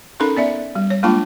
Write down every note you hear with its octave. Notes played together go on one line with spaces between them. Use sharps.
C#4 D#4 A4 A#4 B5
B3 D5 E5
G3
C#5
G#3 A#3 D4 F4 A5 D6